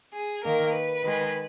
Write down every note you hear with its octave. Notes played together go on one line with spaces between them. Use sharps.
G#4
D#3 A#3 A#4
B4
D#3 G#3